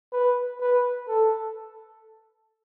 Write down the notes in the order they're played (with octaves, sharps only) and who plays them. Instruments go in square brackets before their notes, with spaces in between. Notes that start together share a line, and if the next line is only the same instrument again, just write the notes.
[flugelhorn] B4
B4
A4